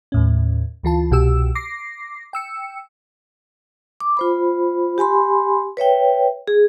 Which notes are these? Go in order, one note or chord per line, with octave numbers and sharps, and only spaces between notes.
D#2 A2 C#4
D2 E3 F4 A5
C2 B2 F#4 G4 E6
D6 A#6 C7
G5 E6 C#7
D6
F4 C5 B5
G4 G#5 B5 C6
B4 C#5 E5 G5
G#4